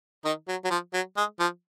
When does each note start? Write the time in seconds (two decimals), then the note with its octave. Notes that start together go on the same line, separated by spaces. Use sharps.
0.25 D#3 D#4
0.48 F#3
0.65 F#3
0.70 F3
0.94 F#3
1.17 G#3
1.40 F3